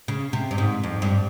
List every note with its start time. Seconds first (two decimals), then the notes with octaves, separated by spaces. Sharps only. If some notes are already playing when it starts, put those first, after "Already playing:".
0.08 C#3
0.33 C3
0.51 G2
0.58 G#2
0.83 F2
1.02 G2